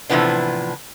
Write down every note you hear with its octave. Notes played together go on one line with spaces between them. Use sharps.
A2 C3 E3 F3 B3 D4